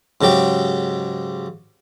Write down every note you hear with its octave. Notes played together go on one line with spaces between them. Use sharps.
G#2 C#3 F#3 G4 G5